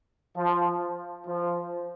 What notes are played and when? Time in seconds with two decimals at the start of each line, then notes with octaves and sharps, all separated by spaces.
0.36 F3
1.27 F3